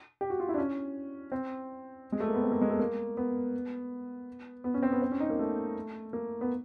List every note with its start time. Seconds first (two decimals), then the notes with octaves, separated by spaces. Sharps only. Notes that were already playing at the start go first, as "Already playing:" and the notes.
0.21 G4
0.30 F#4
0.40 F4
0.49 E4
0.54 D4
0.58 C#4
1.32 C4
2.12 G#3
2.20 A3
2.28 A#3
2.34 B3
2.43 C4
2.52 A#3
2.61 G#3
2.70 A3
2.79 A#3
3.17 B3
4.64 B3
4.74 C#4
4.83 C4
4.92 B3
5.02 C4
5.12 C#4
5.20 D#4
5.30 A#3
5.39 A3
6.13 A#3
6.41 B3